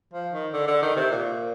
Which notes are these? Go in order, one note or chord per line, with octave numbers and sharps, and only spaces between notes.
F3
D#3
D3
D3
D#3
C3
A#2